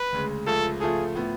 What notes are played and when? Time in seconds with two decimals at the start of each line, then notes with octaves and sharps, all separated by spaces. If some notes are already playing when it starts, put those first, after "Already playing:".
Already playing: B4
0.12 D2 C#3 G#3
0.46 C#2 C#3 F3 A3 F4 A4
0.81 C#3 F3 A3 F4 G#4 A4
1.15 A2 F3 B3